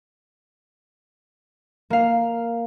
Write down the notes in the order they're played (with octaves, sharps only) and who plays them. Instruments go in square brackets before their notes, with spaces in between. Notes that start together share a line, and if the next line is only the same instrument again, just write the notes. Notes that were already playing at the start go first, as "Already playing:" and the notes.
[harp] A#3 F5